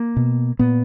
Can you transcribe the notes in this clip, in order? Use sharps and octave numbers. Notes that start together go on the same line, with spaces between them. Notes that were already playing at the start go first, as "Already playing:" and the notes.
Already playing: A#3
B2
A#2 B3